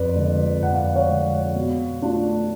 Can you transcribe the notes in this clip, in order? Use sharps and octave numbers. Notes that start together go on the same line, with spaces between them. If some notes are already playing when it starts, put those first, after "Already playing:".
Already playing: F2 B4 D5
D3 G#3
F2 F#5
F5
D5
C#5 F5
D3 G#3
B2
A3 D4 F4